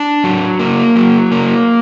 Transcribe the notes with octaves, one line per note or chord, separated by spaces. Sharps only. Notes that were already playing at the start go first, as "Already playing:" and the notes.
Already playing: D4
F#3
A#3
F#3
A#3